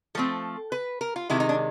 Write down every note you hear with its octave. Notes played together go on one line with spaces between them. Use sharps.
F3 A3 C4 A4
B4
A#4
F4
C3 D#3 G#3 E4
D#4
D4